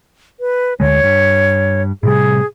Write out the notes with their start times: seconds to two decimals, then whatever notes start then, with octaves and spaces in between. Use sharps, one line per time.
0.40 B4
0.80 D2 D3 G#3 C#5
1.04 G2
2.03 A2 C3 G3 G#4